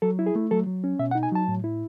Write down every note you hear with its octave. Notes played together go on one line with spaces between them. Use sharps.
F#3 A4
E4
G#4
A3
F#3 A4
F#3
C#4
B2 E5
F#5
D#4
G#5
F#3 A5
A2
E4